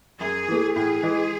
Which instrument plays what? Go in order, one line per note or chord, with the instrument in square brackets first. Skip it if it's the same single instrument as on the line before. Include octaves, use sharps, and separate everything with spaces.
[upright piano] F#2 [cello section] G#4
[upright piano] E3 A3
[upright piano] A2 [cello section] G#4
[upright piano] E3 G#3